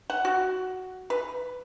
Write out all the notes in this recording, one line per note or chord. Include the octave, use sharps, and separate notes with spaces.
F#5
F#4
B4